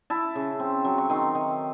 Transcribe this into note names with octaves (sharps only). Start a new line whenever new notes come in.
E4 A5
C#3
C4
F#3
C#6
D#3 C6
D#3